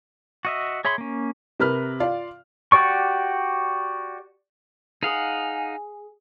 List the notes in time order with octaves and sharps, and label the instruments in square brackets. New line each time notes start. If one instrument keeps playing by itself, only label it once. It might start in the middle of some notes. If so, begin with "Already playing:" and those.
[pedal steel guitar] F#4 D#5 E5
G#4 C#5 E5 B5 C6
A#3 C#4
[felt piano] C3 A#4 B4 F6
F4 D5 F5
[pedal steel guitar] F#4 G4 D5 C#6
[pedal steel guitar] D#4 F5 F#5 [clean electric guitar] G#4